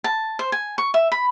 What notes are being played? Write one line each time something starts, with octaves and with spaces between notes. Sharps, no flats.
A5
C5
G#5
C#6
E5
B5